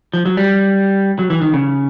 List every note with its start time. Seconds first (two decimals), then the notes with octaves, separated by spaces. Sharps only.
0.14 F3
0.26 F#3
0.37 G3
1.19 F#3
1.30 E3
1.42 D#3
1.54 C#3